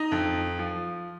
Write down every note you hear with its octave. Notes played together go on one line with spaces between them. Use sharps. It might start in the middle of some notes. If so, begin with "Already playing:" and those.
Already playing: D#4 D#5
F2
F3